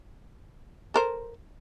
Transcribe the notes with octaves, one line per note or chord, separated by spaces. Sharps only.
A4 A#4 C5